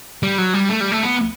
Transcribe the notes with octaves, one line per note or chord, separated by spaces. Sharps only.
G3
F#3
G3
A3
G3
A3
B3